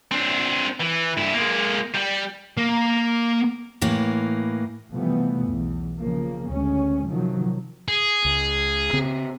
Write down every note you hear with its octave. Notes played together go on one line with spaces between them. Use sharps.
C4 D4
E3
G2 E4
G#3 A#3
G3
A#3
A2 E3 A#3
C3 E3 F3 G3 A3 B3
B1 E2
C#3 F3 A#3
D2 G#3 C#4
C3 D#3 F3 F#3
G#4
C#2
C#3 C4